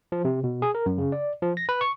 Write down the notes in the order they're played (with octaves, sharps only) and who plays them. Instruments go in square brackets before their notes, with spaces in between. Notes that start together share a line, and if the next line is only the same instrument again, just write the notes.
[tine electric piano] F3
C3
B2
G#4
A#4
F#2
C#3
D5
F3
A#6
B4
C#6